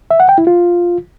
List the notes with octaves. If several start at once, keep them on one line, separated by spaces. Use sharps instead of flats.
E5
F#5
G5
E4
F4